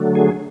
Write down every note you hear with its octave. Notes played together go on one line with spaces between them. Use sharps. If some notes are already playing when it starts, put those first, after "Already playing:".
Already playing: D3 F#3 A3
G#4